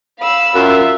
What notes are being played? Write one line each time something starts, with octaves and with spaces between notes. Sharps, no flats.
F5 B5 E6
F#2 F4 E5